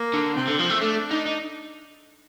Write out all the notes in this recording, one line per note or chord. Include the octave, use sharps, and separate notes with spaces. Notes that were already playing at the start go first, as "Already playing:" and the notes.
Already playing: A#3
D3
C3 C4
D3
F3
A3
A3 D4
D#4
D#4